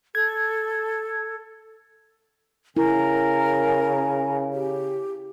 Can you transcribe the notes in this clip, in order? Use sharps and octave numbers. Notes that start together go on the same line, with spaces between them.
A4 G#6
C#3 E4 A#4 G#5
G4